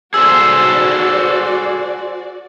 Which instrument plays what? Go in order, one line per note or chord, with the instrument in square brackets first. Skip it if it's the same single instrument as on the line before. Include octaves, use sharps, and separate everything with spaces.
[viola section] F#4 D5 [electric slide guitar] G#4 A4 C5 [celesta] E6